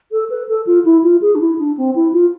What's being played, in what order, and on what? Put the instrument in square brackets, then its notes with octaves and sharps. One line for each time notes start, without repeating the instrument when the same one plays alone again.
[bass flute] A4
B4
A4
F4
E4
F4
G#4
D4
E4
D4
C4
E4
F4